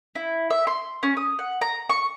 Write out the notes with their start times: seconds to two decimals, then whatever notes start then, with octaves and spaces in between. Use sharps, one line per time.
0.15 E4
0.50 E5
0.67 C6
1.03 C#4
1.17 D#6
1.39 F#5
1.61 A#5
1.89 C#6